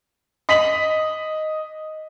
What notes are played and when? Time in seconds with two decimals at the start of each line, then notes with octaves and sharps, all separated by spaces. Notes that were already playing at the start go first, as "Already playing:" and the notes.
0.49 D#5 B6 F#7